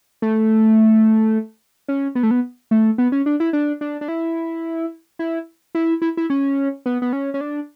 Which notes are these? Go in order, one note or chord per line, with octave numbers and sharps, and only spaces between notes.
A3
C#4
B3
A3
B3
A3
B3
C#4
D4
E4
D4
D4
D4
E4
E4
E4
E4
E4
C#4
B3
B3
C#4
C#4
D4